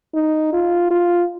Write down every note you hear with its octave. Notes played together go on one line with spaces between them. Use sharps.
D#4
F4
F4